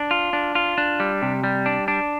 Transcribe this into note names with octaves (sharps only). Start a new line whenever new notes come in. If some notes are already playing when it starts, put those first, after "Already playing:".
Already playing: D4
F4
D4
F4
D4
G3
C3
G3
D4
D4